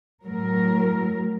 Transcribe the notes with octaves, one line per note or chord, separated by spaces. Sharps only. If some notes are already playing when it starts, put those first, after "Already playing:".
A2 F#3 A#4